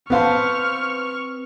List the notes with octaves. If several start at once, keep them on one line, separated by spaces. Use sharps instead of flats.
B3 C4 B4 C5 F5 A5 C#6 F6